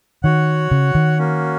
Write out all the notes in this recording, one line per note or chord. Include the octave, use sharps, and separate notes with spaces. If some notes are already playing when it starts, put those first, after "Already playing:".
D#3 F#4 C#5 F#5
C#3
D#3
A#3 C#4 F#4